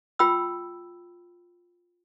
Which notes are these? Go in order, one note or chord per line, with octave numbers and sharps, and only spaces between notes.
F4 G5 B5 E6